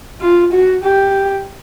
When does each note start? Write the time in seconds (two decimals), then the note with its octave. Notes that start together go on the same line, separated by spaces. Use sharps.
0.21 F4
0.52 F#4
0.84 G4